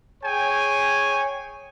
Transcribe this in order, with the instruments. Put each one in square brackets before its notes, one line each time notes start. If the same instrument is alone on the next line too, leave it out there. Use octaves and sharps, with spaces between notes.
[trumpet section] G#4 C#5 G5 G#5